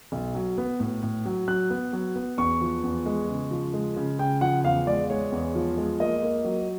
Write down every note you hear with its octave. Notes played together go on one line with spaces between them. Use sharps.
B1
F#3
B3
A2
A2
F#3
F#3 F#6
B3
F#3
B3
E2 C#6
F3
E2
G#3
C#3
F3
G#3
C#3
C#3 G5
F3 F#5
E2 F5
G#3 D5
G#3 C#5
E2
F3
G#3
A#3 D#5
A#3
F#3